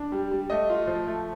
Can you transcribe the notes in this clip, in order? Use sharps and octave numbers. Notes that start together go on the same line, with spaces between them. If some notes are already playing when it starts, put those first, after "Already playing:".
Already playing: D4
G3
G3
A3 D#5
F4
F3
A3